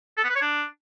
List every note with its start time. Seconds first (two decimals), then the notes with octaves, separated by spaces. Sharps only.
0.18 A4
0.24 B3
0.30 B4
0.36 C#5
0.42 D4